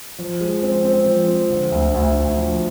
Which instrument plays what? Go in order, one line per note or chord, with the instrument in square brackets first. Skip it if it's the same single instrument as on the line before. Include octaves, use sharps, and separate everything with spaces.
[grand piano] F3
G#3
C4
C4
F3
C4
D3
D2
D2
D2
F3